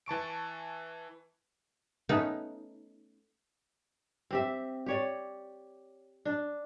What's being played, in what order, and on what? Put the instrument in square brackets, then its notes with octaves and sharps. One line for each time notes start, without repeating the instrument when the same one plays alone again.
[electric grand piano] E3 A5 C#6 D7
[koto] A3 B3 C#4 D#4
[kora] C4 G4 E5
G4 C#5 D5
D4